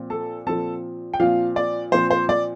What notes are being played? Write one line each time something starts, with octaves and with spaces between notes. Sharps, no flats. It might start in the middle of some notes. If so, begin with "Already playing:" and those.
Already playing: A#2 F3 C4
A4 A5
A#2 F3 C4 A4 A5
G5
A#2 F3 C4 F4 F5
D5
A#2 F3 C4 C5
C5
D5